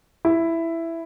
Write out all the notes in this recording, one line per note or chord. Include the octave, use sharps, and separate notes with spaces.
E4